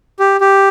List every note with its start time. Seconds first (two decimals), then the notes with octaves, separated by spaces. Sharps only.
0.19 G4
0.41 G4